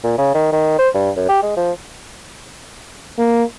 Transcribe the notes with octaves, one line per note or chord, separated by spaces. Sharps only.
A#2
C#3
D#3
D#3
C5
G2
F#2
G4
G#3
F3
A#3